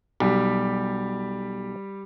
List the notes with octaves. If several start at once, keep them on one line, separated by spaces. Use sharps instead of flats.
B1 G3 G4